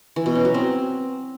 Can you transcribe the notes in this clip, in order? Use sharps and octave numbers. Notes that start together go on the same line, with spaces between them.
E3
B2
C#4
F#3
C4